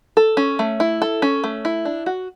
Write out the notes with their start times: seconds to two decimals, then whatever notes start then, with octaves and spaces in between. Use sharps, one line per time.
0.17 A4
0.37 C#4
0.59 A3
0.80 E4
1.02 A4
1.22 C#4
1.44 A3
1.65 E4
1.85 D4
2.06 F#4